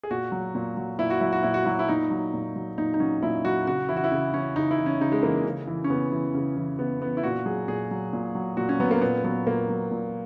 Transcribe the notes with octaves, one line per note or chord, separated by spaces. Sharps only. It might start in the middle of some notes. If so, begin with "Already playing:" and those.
G#4
A#2 F#4
F#3
A#2
F#3
A#2 E4
F#4
F#3 E4
F#4
A#2 E4
F#4
F#3 E4
E4
A#2 D#4
F#3
A#2
F#3
A#2 D#4
D#4
F#3 C#4
A#2 E4
F#3 F#4
C#3 F#4
E3 E4
F#4
E4
C#3
E3 C#4
C#3 D#4
E4
E3
C#4
C#3 D#4
G#3
E3 A#3
C#3
E3
C#4
C#3 B3
E3
C#3
E3
C#3 B3
E3 B3
E4
A#2 F#4
F#3 G#4
A#2 G#4
F#3
A#2
F#3
A#2 F#4
C#4
F#3 B3
A#3
A#2 B3
F#3 B3
A#2 A#3
F#3
A#2